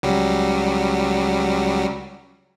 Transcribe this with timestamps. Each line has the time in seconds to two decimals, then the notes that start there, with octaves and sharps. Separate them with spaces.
0.03 C#2 F#3 G3